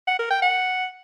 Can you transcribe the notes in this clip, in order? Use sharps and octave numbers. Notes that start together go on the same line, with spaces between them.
F#5
A#4
G5
F#5